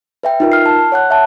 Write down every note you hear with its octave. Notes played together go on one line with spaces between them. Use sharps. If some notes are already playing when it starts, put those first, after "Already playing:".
B4 E5 G5
D#4 F4 A#4
F6 C7
A5
C#5 F#5 F#6
E5 A5